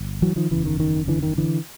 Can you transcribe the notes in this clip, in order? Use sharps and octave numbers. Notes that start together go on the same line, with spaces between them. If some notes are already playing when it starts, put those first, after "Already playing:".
Already playing: G1
E3 F#3
D#3 F3
F#1 E2 C#3 E3
D#3
D#3
D3 E3
D#3
D3 E3